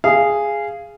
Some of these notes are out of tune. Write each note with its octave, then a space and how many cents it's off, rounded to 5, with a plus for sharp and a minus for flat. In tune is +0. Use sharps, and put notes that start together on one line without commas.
G#4 -5 F5 -20